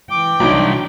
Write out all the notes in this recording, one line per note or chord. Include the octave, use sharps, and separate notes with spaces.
E3 G5 D6
C2 F#3 D4 D#4